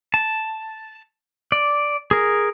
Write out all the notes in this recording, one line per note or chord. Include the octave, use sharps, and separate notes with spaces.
A5
D5
G#4 A#4